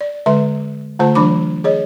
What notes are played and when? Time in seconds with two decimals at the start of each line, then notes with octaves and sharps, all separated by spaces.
0.01 D5
0.26 D3 G#3 B4 E5 C6
0.99 D3 A3 F4 C5 A5
1.15 E3 F#3 D4 B5 D6
1.64 G#4 C#5 D#5